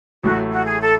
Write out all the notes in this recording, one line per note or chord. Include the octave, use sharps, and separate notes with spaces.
A1 A2 F#3 A3 E4 F#4
F#4
G#4
A4